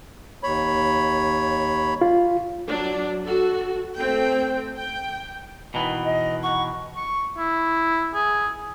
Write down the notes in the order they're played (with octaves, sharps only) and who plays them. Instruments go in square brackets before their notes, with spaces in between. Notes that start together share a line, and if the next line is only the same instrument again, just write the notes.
[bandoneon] D#2 C#5 B5
[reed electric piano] F4
[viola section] F#3 D4
F#4 A4
A3 C4 G5
G5
[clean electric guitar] B2 D#3 E3
[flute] D#5
[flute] F#5 [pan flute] C#6
[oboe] C#6
E4
G#4